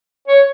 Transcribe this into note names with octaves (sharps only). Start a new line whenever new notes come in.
C#5